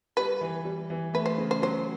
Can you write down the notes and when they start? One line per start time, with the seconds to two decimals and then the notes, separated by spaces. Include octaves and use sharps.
0.17 G3 B4
0.41 E3
0.65 G3
0.90 E3
1.14 A3 B4
1.26 C5
1.38 C#3
1.51 C5
1.62 F#3 C5